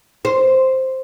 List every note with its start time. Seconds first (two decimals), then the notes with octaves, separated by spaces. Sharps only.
0.25 C5